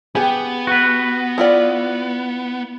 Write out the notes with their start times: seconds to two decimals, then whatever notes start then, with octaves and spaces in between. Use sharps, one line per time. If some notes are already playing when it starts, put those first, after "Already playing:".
0.15 B3 G4 G#4
0.67 F#4 B4
1.38 E4 F4 D5